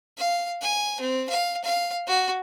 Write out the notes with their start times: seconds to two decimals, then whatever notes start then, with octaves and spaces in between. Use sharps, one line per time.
0.17 F5
0.61 G#5
1.00 C4
1.29 F5
1.64 F5
2.07 F#4